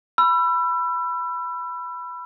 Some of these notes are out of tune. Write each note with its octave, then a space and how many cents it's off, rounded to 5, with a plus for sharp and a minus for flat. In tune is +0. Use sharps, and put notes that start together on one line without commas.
B5 +0 E6 +35